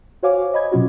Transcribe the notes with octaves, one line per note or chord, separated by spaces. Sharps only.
F#4 C5 C#5 F5 G#5 D6
D#5 B5 G#6
B2 F#3 C#4 F4 F#4